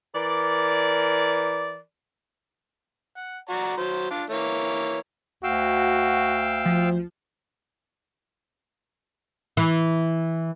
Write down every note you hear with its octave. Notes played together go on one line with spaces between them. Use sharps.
E3 A#4 D5
F#5
F#4 D5 A#5
F#3 C5
D4 F4
E3 A#3 C#5
D2 F#4 F5 G5 E6
F3
E3